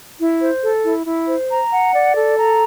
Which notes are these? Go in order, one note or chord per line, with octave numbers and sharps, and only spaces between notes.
E4
C5
A4
E4
E4
C5
A#5
F#5
D5
A4
A#5